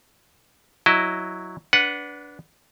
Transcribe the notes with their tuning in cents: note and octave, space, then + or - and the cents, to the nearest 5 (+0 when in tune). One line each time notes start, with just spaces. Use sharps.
F#3 +0 E4 +0 D#5 +0
D4 -20 B4 -5 F#5 +0